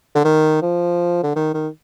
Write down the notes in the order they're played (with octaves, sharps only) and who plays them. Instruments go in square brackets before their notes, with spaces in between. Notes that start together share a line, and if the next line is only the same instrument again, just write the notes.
[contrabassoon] D3
D#3
F3
D3
D#3
D#3